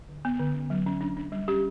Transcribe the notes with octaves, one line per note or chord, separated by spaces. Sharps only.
D3
B3
D3
C#4
F#3
C#4
D4
D4
G3
C#4 G4